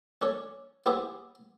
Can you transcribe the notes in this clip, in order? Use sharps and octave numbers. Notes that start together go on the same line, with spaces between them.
C#4 D4 A4 C#5
B3 E4 G4 G#4 C5 E5